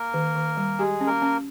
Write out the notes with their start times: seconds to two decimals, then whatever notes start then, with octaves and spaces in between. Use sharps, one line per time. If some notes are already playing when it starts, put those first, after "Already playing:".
Already playing: A#3 A#4
0.14 D#3
0.35 D#3
0.57 G3
0.79 G#3 G4 G#4
1.01 C#4
1.07 A#3 A#4
1.22 C#4